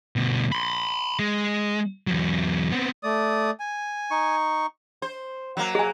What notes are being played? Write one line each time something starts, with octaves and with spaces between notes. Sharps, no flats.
D2 B2
B5 C6
G#3
E2 F#3
B3 C4
A3 D5 D#6
G#5
D#4 C#6
C5
F#3 A#3
G#4 G#5